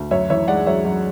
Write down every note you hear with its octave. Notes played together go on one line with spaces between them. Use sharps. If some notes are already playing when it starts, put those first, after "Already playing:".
Already playing: D2
F#2 C#5 E5
E3 C#5 E5
G#3 D5 F#5
F#2 C#5 E5
F#2